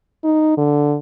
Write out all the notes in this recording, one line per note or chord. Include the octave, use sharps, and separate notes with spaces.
D#4
D3